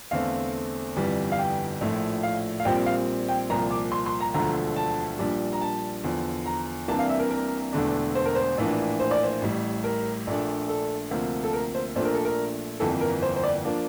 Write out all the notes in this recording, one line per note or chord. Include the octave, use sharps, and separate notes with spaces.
E2 D3 A3 C4 F5
G1 F2 E3 G3
F5
G5
A#1 A2 F3 A3
F5
F5
A#1 A#2 G3 C4 G5
F5
G5
C2 A#2 F3 A#5
D6
C6
C6
A#5
E1 D2 D3 F3 A3 A#5
A5
A#1 A#2 G3 D4
A#5
A5
E2 D3 F3
A#5
C2 C3 E3 A#3 D4 A5
F5
E5
A#4
A#4
E1 E2 D3 A3 D4
C5
A#4
C5
A#1 A2 E3 A#3 D4
C5
D5
C5
A1 A2 G3
A#4
A#1 A#2 A3 D4
A4
D2 C3 F3 A#3
A4
A#4
C5
A#1 A#2 A3 D4 C5
A#4
A4
A#4
G1 F2 E3 A#3 A4
A#4
C5
C5
D5
F3 A#3 D4